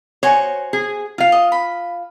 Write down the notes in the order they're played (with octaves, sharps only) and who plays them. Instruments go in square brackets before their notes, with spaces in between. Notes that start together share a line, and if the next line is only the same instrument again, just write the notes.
[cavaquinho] F#4 C5 G#5 [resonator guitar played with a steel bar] C#5
[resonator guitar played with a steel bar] G#4
F4 F5
[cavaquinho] D#5
B5